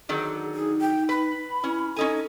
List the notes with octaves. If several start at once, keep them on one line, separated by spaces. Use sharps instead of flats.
D3 D#3 F#3 G#4
D#4 G#4
G5
B4 B5
C#4 E4
C#4 D#4 A4 G#5